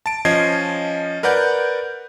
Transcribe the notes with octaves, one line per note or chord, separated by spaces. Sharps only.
A5 D7
F3 C#4 D#5 A5 G#6 C7
A#4 B4 D5 F#5 G6